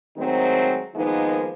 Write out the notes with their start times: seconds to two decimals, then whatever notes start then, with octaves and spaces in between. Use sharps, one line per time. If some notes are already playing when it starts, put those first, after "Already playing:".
0.17 D#3 F#3 G#3 A3 C4
0.96 D#3 F3 G#3 A#3 B3 D#4